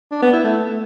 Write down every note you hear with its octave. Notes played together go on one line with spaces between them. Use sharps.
D4
B3
E4
A3